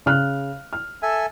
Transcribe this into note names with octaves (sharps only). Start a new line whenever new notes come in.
C#3 F6 F#6
F6
A4 E5 G#5